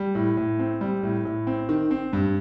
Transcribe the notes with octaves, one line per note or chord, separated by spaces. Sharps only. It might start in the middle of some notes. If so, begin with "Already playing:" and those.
Already playing: G3
A2
A2
C4
G3
A2
A2
C4
D#3
C4
G2